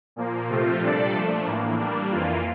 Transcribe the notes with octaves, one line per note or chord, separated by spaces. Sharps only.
A#2 F3 A#3
C3 F3 A3 C4 F4
A#2 G3 D4 A4 D5
F3 A3 D4
A2 E3 A#3
G3 A#3 D4
F2 E3 A#3 F4